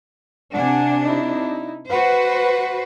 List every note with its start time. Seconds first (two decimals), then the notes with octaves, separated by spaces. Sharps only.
0.54 C3 D4 F#5 G#5
1.05 D#4 E4
1.89 F#4 B4 C5 F#5